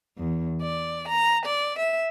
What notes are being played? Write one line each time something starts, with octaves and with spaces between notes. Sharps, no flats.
E2
D5
A#5
D5
E5